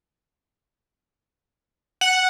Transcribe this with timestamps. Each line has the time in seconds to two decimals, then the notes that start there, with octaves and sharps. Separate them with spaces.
2.01 F#5